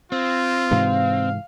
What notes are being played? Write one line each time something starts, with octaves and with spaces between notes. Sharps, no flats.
C4 F4
G#2 C3 E3 F5